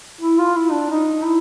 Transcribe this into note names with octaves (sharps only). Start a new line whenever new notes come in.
E4
F4
E4
D4
D#4
E4